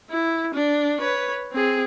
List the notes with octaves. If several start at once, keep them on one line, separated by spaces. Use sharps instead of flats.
E4
D4
B4 C#5
C4 G#4